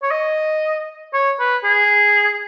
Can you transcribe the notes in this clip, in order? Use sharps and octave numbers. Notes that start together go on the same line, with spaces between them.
C#5
D#5
C#5
B4
G#4